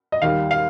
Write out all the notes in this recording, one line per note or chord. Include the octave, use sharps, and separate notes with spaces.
D#5
D#2 D#3 G3 F5
F5